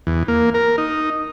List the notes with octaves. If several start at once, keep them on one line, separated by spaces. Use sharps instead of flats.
E2
A#3
A#4
D#4